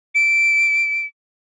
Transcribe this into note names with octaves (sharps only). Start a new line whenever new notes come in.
D7